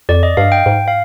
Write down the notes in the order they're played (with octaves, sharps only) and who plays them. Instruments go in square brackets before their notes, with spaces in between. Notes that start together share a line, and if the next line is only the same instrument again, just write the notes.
[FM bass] F2 [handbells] D5
[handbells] D#5
[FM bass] G2 [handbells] F5
[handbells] G5
[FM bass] G#2
[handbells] F5